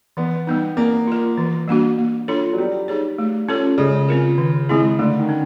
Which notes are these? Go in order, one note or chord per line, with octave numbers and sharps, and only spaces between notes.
E3 B3
G3 B3 D#4
A#3 C4
F4 A#4
E3
G3 A#3 D4 F#4
A#3
D4 F4 A4 C#5
F#3
G3 B3
D#4 G#4 C#5
A3
C#4 F4 A4 C#5
C#3 G#3
C4 F4 A#4
D#3
G#3 C4 E4 G#4
D3 A3
D#3
C#4